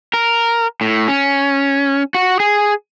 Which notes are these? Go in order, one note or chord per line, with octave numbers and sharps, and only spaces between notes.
A#4
A2
C#4
F#4
G#4